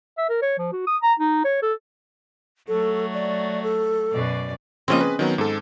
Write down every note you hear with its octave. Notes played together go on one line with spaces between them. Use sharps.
E5
A#4
C#5
F3
F#4
D#6
A#5
D#4
C#5
A4
F#3 A3 A4
D5
A4
F#2 B2 D5
C#3 F3 A#3 C4 C#4 D#5
G#4 B4
D#3 F#3 B3
G#2 A4